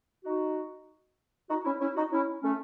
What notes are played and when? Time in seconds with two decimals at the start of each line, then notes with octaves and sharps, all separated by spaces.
0.25 D#4 F#4
1.49 D#4 F#4
1.64 C#4 E4
1.80 C#4 E4
1.96 D#4 F#4
2.11 C#4 E4
2.43 A3 C#4